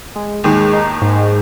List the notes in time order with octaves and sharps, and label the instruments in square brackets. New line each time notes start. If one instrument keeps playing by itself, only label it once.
[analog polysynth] G#3
[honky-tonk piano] D#2 D#3 [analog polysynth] G#3
[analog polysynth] D#4
G#2